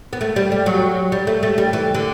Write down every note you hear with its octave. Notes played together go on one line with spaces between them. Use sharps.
B3
A3
G3
G3
F#3
G3
A3
A3
G3
E3
D3